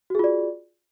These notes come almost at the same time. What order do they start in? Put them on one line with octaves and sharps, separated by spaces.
F#4 G#4 F4 D5